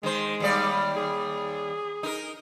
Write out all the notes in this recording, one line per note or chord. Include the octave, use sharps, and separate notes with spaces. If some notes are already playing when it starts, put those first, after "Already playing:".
D#3 G#3 C5
D#2 G3 D5
G#4
D#4 A#4